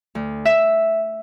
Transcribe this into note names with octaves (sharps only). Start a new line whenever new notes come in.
D2
E5